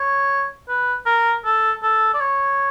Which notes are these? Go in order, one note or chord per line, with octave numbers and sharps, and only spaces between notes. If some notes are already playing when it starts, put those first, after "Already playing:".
Already playing: C#5
B4
A#4
A4
A4
D5
C#5